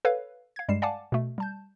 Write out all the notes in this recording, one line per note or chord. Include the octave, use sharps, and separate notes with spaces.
A4 B4 C#5 F5
F5 G#6
G2 G3 G#3 C7 E7
D5 F5 F#5 G#5 A5 D6
B2 A3
G3 A5 G6